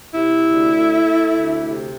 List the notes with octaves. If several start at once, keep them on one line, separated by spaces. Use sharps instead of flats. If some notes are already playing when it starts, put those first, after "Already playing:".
C3 E4
D2
A3
A3
D2
C3